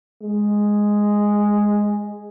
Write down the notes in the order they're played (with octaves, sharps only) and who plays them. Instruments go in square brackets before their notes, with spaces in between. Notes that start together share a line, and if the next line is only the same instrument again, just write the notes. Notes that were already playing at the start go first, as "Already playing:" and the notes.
[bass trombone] G#3